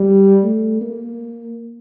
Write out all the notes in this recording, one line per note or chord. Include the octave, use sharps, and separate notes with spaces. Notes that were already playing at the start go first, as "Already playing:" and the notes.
Already playing: G3
A3
A#3